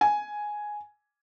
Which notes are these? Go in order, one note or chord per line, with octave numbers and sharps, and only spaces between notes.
G#5